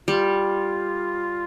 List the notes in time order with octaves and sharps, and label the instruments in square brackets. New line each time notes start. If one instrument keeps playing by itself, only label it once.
[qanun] G3 [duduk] F4